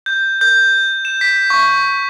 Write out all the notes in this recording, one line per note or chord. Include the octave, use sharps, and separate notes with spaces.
G6
G6
E7
B6
C#6